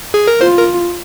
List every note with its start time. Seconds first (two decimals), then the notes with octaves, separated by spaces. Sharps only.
0.14 G#4
0.27 A#4
0.40 F4 C5
0.58 A#4